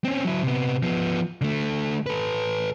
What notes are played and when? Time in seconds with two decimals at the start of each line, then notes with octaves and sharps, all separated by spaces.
0.05 C4 C#4
0.25 F#3 E4
0.43 C3 B3
0.83 F3 B3
1.41 D3 A3
2.06 A4 B4